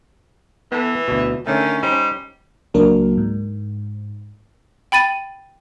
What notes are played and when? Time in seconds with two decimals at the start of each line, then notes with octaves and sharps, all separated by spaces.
0.72 E3 B3 A4
1.08 D2 B2
1.47 D3 D#3 A3 C#4
1.83 G3 D#4 C5
2.74 C#2 F#3 A#3 D4 A#4
3.18 G#2
4.92 G5 B5 A6 D#7